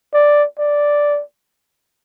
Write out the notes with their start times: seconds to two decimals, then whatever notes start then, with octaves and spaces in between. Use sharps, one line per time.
0.13 D5
0.58 D5